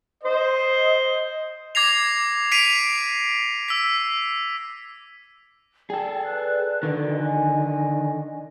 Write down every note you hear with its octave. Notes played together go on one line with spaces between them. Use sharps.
C5 D#5
D6 G#6 A#6 C7 F7
B6 C7 D7 D#7 F7
E6 B6
G#4 A4 D5 G5
B4 D5 F#6
D3 D#3 F#4 A4
D#5 G#5